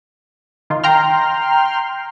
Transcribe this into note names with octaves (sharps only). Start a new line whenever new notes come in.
D#3 F4
G5 A#5 C6 F6